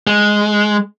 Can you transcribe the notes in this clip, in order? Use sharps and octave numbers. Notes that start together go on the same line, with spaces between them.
G#3